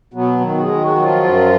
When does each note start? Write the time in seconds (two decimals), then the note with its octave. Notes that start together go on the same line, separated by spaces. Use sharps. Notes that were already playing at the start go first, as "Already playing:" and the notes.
0.13 B2 F#3 B3
0.41 D#3
0.57 F#4
0.61 G#3 G#4
0.69 D#3
0.82 F#3 F#4
0.95 F#3
1.02 F3 F4
1.23 F#2